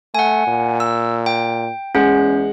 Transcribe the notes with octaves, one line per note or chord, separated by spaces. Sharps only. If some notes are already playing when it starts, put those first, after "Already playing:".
A3 F#5 G#5
A#2
E6
G5
E2 G#3 C#4 F#5